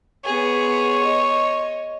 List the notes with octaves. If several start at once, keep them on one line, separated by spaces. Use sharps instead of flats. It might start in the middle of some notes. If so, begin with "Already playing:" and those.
B3 G#4 C#5
D#5